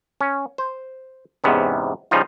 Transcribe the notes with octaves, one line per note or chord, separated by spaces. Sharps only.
C#4
C5
E2 G#2 C3 B3 C#4
C#3 F3 G3 D#4 F4